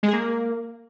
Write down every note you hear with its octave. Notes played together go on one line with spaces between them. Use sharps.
G#3
G#4
A#3